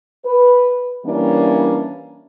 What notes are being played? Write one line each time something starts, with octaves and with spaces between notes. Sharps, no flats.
B4
E3 G3 A#3 C#4 D4